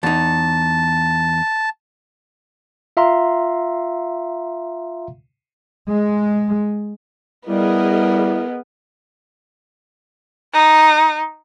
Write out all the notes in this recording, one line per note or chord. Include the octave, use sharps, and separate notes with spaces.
E2 D#4 A5
F4 E5 F5 A#5 C6
G#3
G3 B3 E4 G#4 A#4 D#5
D#4